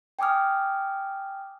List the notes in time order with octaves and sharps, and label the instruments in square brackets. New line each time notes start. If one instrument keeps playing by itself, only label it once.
[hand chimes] G5 G#5 D6 D#6 F6